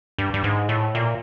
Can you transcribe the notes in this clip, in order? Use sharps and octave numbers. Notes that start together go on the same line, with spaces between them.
G2
G2
G#2
A2
A#2